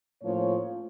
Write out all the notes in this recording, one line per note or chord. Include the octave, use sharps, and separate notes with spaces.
A2 F3 A#3 C#4 C#5